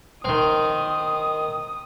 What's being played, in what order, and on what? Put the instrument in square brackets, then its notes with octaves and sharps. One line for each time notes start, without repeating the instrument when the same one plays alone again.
[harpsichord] D#3 C4 [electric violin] D#6